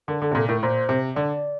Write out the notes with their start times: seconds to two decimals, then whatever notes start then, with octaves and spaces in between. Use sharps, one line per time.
0.08 D3 A#4
0.22 D3 A4
0.31 C3
0.35 A#2 A4
0.48 A2 A#4
0.62 A#2 C5
0.89 C3
1.15 D3 D5